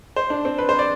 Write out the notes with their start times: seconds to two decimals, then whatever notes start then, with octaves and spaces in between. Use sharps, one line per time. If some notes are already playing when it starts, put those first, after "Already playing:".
0.16 C5
0.30 D4
0.45 C4
0.58 B4
0.69 C5
0.79 D5